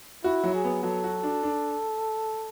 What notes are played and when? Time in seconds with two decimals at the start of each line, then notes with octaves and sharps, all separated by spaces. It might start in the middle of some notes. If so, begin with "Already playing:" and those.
0.24 E4 F#4
0.44 F#3
0.54 G#4
0.64 B3
0.83 F#3 A4
1.04 F#4
1.23 D4
1.43 D4